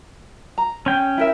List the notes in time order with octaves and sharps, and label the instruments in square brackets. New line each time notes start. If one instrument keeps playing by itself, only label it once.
[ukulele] A#5
[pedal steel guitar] C#4 G5
[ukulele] E4 A#4 E5